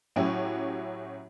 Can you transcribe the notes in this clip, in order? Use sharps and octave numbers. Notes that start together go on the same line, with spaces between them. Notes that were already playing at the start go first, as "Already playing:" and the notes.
A2 F#3 C#4 E4 F#4 G4